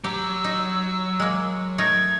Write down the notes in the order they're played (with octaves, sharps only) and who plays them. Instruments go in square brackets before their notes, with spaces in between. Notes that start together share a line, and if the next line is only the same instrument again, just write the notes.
[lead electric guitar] F#3 A#5 [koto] G4 [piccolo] E6
[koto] D#4
G#3 A#3
[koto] A3 D#4 A#4 [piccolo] G#6